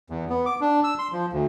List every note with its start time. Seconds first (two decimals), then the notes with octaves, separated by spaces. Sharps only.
0.10 E2
0.30 B3
0.46 D6
0.61 D4
0.84 E6
0.99 C6
1.12 F3
1.33 D2